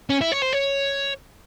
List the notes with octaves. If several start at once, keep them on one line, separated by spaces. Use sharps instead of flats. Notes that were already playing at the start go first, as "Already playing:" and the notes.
C#4
E4
C#5
C5
C#5